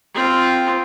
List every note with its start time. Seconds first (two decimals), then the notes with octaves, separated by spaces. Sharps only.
0.14 C4 F4